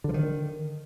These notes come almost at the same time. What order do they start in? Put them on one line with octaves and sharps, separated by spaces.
D3 F3 D#3